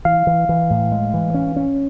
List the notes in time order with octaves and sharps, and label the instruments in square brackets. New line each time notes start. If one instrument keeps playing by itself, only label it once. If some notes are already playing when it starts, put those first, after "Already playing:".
[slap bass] E3 [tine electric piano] F5
[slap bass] E3
E3
A2
G#3
E3
C#4
C#4